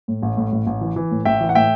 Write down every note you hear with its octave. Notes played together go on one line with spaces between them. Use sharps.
A2
A1
A2
A1
A1
E3
E3
A2
A1 E5 G5
E3
F#5
A2 E5 G5